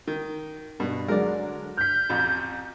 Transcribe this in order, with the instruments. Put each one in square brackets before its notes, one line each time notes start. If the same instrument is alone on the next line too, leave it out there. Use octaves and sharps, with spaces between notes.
[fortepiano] D#3
[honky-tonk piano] G2 [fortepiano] B2
[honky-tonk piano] D3 F#3 G#3 [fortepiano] A#4 D5
[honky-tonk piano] F6 B6 [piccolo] G6
[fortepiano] A1 F2